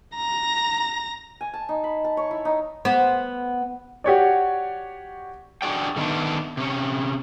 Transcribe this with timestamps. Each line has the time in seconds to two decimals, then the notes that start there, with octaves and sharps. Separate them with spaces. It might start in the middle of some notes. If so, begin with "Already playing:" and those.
0.15 A#5 A#6
1.41 G#5
1.53 A5
1.69 D#4
1.84 B5
2.04 A5
2.17 C#5
2.31 E4
2.45 D#4
2.85 B3 C5
4.04 F#4 G4 C#5 D5
5.62 D4 F#4 G#4 D5 G5
5.96 D3 D#3 A3 B3 D4
6.57 C3 C#4